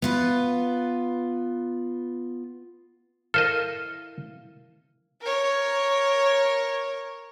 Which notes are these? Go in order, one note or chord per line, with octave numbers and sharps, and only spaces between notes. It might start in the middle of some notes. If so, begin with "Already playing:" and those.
B3 F4 B4
E4 A4 A#4 C5 D#5 F5 F6
A#4 C#5